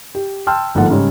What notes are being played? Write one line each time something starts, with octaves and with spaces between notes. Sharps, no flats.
G4
G5 A5 C6 E6 F6
G1 G#2 F3 A#3 A4 F#5
G#2 C#3 G3 C#4 D#4